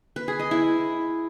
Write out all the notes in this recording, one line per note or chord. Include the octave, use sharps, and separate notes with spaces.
B4
G#4
D#5
E4